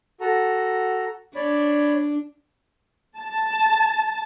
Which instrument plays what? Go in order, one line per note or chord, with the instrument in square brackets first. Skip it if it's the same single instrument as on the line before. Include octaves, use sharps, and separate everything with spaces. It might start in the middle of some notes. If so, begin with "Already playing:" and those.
[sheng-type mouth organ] F#4 A4 A#5
[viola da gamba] D4 [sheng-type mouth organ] C#5 D5 B5
[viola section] A5